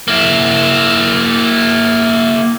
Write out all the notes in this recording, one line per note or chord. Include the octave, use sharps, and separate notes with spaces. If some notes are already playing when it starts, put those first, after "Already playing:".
A#3 E4